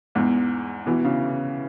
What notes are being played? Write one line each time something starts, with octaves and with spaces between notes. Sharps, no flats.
E2 G#2
B2 E3
C#3